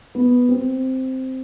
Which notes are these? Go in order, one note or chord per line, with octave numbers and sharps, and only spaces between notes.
B3
C4